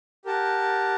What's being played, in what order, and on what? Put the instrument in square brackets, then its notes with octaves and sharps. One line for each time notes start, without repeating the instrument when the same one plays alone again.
[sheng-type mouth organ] G4 A#4 F#5 A5